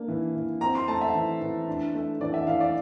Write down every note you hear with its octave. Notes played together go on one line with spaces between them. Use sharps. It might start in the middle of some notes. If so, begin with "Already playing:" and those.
Already playing: A#3 D4
E3
E3
C4 A#5
C6
A3 A5
E5
E3
E3
D4
A3
E3 D5
E5
E3 F5
D5